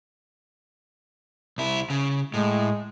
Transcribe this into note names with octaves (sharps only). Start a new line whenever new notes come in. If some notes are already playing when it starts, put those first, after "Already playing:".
C2 E4
C#3
A2 G#3